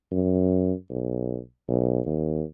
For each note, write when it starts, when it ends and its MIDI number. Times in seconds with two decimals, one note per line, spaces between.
0.12 0.72 42
0.90 1.38 35
1.69 2.00 35
2.06 2.43 39